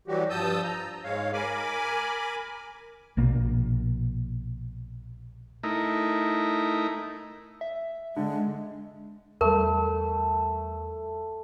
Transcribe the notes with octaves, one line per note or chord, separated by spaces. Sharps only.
E3 F#3 G3 F#4 G4
G2 F3 A5 D#6 E6 G6
A#5
G#2 G#3 C#5 F5
A#4 G#5 B5 D6
A#1 B2 A#3
A3 D#4 E4 A#4
E5
D3 G#3
E2 G3 A3 A#4